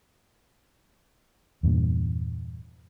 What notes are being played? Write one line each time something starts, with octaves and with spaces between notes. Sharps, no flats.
E2 G2 A#2